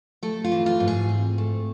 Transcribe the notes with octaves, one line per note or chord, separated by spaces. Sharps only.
A3 A4
F4
E3
F4
G#2
G#4
C4
A3